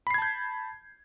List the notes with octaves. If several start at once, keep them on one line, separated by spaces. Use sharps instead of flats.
A5 B5 G6 G#6 C7